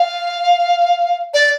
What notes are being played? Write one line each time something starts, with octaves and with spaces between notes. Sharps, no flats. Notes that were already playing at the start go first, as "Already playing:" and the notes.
Already playing: F5
D5